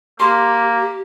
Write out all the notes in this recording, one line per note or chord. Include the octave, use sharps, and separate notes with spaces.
A#3 G4 C6